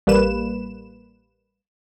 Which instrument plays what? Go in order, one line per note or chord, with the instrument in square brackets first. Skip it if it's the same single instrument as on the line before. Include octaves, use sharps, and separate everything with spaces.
[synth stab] A1 G3 A#3 B4 E7